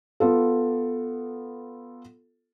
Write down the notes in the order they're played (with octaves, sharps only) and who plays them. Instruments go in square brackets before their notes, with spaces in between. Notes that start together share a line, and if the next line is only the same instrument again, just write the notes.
[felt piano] B3 F4 A4